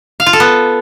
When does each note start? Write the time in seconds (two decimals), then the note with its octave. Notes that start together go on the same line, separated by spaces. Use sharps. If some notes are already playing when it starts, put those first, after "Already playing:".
0.20 F5
0.26 F4
0.33 A4
0.40 B3